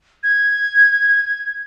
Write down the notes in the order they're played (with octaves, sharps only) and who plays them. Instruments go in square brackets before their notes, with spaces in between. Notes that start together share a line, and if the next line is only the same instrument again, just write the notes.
[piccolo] G#6